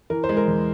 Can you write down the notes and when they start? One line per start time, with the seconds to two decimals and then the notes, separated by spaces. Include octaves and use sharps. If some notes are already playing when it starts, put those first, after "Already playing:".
0.10 E3 A#4
0.24 C5
0.29 G#3
0.37 A#4
0.47 E2